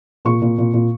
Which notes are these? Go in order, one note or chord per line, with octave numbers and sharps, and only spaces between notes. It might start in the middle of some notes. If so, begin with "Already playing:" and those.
A#2 C#6
A#2
A#2
A#2